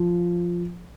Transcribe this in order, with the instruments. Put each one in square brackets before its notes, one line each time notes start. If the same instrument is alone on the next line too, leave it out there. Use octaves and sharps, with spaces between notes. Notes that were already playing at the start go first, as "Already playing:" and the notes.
Already playing: [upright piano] F3